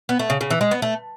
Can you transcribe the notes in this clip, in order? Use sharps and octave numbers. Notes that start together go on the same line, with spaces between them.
B3
A3
C#3
C#3
E3
G#3
B3
A3